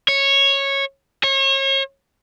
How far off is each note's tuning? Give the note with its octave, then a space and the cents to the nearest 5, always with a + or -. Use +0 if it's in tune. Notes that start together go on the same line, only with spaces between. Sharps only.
C#5 -10
C#5 -35